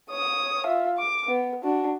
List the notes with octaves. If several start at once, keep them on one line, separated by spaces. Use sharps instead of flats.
C#5 D#6
F4 E5
D6
B3
D4 F#4